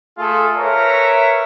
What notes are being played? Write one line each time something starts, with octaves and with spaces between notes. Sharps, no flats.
A3 F4 G#4 A4
A#4 B4 C#5 E5 A#5